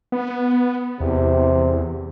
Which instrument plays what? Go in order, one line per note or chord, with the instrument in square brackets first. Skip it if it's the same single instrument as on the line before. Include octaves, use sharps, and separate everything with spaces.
[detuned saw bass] B3
[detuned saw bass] E2 [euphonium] C3